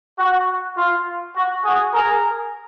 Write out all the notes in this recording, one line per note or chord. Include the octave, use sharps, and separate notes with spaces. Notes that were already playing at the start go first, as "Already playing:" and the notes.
F#4
F4
F#4
F#4 G#4
G#4 A#4